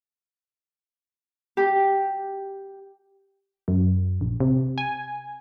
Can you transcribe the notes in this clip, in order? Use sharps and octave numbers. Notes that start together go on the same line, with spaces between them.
G4
F#2
A#1
C3
G#5